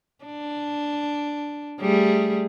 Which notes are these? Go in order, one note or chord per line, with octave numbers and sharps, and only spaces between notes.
D4
G3 A3 G#4